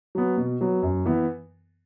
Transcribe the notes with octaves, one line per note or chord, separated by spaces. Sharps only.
F#3 B3
B2
F#3 B3
F#2
E3 B3